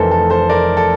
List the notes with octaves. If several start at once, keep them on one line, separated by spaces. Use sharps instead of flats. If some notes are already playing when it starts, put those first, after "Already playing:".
Already playing: F1 F2 E3 A3 A4 A#4 C5
A4
A4 C5
A#4 D5
A4